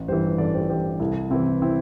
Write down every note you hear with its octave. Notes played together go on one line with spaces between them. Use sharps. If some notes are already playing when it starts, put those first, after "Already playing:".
Already playing: A1
G2 E3 G4 C5
A1 A4 D5
G4 C5
G2 E3 G4 C5
C2 E4 A4
C3 E3 C4 E4
C4 E4